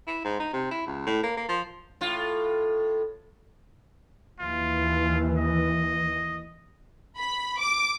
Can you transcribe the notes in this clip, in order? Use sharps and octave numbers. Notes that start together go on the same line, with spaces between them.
E4
G#2
D#4
C3
E4
C#2
A2
A#3
A#3
F3
A2 F4
D#2 E3 F4
D#5
B5
D6